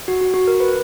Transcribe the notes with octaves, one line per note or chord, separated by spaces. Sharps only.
F#4
F#4
F#4
A#4
B4